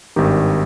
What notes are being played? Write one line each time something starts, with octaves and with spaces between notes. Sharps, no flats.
G#1 G2 D#3 D#4 G4